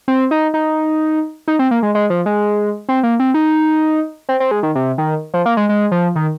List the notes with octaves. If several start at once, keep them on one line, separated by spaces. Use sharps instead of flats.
C4
D#4
D#4
D#4
C4
A#3
G#3
G#3
F3
G#3
C4
A#3
C4
D#4
C4
C4
G#3
D#3
C3
D#3
F3
A#3
G#3
G#3
F3
D#3